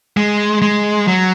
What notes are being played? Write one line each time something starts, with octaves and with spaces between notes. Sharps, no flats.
G#3
G#3
F#3